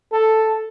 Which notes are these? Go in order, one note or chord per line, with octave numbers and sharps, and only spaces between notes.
A4